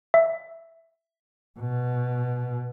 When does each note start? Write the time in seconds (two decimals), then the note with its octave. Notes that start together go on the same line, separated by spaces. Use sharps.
0.14 E5
1.60 B2